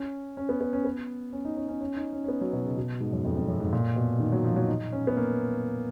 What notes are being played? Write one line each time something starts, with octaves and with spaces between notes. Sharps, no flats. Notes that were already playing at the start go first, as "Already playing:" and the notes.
Already playing: C#4
C#4
B3
B3
C#4
B3
C#4
D#4
C#4
C#4
C#4
D#4
C#4
C#4
B3
F#3
B2
C#3
B2
G#2
F#2
F2
F2
F#2
G#2
A#2
B2
D#3
F#3
F3
F#3
D#4
C#4
B3
A#3